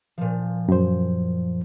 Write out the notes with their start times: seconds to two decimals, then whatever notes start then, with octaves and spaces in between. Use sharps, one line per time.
0.18 A#2 F3
0.68 F#2 C5